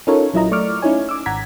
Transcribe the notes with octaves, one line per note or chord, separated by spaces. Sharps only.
C#4 D#4 F4 A4 A#4 C#5
A#1 F#3 E4 F4 D#5 A#5
A3 D5 C#6 D6 F6
C#4 D#4 E4 C#5 G#5
D6 E6
G#1 F#5 A#5 G#6 B6